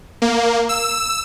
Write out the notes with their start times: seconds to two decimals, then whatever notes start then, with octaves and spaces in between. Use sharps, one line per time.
0.22 A#3
0.69 E6